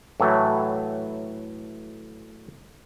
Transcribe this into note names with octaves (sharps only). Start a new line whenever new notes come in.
A2 E3 F#3 A3